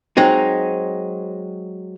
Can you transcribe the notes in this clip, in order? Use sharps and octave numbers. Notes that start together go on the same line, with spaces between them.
F#3 G#3 C4 D#4